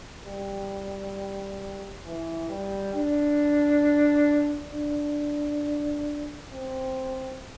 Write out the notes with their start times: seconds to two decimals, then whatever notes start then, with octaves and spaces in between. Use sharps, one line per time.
0.25 G3
2.05 E3
2.49 G3
2.95 D4
4.74 D4
6.53 C4